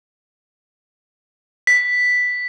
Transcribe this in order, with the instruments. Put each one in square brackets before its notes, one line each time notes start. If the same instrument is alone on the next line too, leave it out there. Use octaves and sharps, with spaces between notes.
[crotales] B6